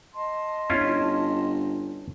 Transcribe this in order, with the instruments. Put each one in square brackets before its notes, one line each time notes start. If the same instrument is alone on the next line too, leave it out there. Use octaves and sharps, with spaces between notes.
[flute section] D#5 A5 C6
[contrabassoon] G1 [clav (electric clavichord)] C#4 E4 F4